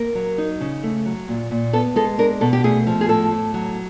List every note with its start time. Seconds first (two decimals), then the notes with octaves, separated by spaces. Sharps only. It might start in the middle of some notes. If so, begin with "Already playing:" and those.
Already playing: A#3 A#4
0.15 F#3
0.38 D#4
0.61 C#3
0.83 A3
1.06 F#3
1.28 A#2
1.51 A#2
1.73 B3 A4
1.96 G#3 A4
2.18 D4 A#4
2.41 B2 A4
2.53 G4
2.64 A3 G#4
2.87 F3
3.01 G#4
3.09 A2 A4
3.31 A2
3.54 F#3